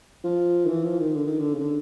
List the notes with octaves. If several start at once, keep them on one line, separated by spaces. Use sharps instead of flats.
F3
D#3
E3
F3
D#3
D3
D#3
D3
C#3
D3